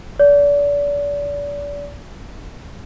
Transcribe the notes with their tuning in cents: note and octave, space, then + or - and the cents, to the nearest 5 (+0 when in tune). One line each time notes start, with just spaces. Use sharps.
D5 -35